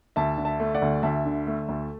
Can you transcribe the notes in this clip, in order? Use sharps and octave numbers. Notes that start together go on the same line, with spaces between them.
D2 E5 A5
D3
E5 A5
A3
D5 F#5
D2
D2 E5 A5
D3
A3
D2